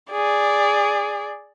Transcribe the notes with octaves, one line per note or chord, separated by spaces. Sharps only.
G#4 D5